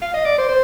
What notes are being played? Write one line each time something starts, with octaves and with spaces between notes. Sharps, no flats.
F5
D#5
D5
C5
C5